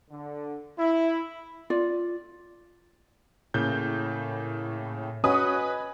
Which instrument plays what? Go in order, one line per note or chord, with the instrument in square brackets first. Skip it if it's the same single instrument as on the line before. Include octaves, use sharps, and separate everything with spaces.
[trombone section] D3
E4
[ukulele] F4 D5
[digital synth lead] A2 [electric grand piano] C#3 A#3 [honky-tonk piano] G6
[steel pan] C#4 F#4 [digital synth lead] B4 [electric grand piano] D#5 G#5 B5 [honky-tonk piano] D#6